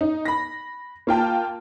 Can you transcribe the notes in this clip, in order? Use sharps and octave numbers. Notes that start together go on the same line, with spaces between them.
D#4
B5 A#6
A#3 F4 G5 A5